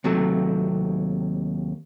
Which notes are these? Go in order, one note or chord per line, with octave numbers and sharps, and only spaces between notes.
D#2 C3 F#3 A3